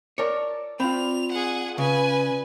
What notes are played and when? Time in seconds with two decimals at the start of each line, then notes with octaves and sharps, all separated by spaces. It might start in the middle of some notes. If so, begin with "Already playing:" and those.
0.18 A#4 C#5 D5 A5 E6
0.80 C4 F4 B5 F7
1.32 G#4 F#5
1.78 C#3 B4 G#5